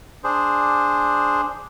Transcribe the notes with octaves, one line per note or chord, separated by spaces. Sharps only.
D4 G#4 C5